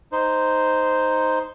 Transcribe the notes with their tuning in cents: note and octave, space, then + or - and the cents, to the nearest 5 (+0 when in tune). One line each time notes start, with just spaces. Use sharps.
D#4 +0 C5 -5